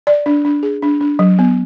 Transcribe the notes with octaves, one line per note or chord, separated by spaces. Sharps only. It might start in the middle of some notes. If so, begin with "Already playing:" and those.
D5
D4
D4
G#4
D4
D4
F#3
B3